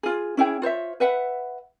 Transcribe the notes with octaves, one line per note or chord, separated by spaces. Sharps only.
F4 G#4
C#4 E4 G#4 G5
F4 C5 C#5 E5
B4 E5 F#5